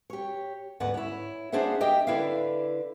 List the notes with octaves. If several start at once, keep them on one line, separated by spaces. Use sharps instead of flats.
G4 C#5
D2 G#2 B3 B4 F#5
E4 C#5
A#3 D4 G#4 C5 E5 F#5
G4 D#5 E5 G5
D3 E4 B4 D5 E5 F5